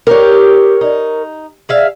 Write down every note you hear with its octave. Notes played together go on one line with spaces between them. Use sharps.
G4 A#4 C#5
D#4
G#4 E5 F5